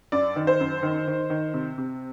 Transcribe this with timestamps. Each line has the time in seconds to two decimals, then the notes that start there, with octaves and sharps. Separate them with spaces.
0.12 F#2 D5
0.36 D#3
0.47 C5
0.60 F#2
0.83 D#3
1.07 D#3
1.30 D#3
1.54 C3
1.78 C3